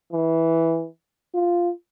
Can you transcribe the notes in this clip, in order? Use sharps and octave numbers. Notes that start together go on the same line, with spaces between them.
E3
F4